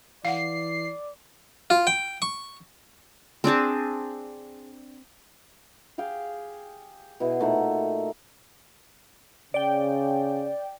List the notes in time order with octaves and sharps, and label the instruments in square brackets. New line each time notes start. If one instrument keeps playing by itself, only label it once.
[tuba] E3 [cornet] D5 [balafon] F5 F#5 [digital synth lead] C7
[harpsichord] F4
G5
C#6
[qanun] C4 D4 G#4 A5
[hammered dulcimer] G4 G#4 F5 G5
B2 E4 G#4
A#2 A3 D#4 F#5
[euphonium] C#3 [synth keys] D5 G5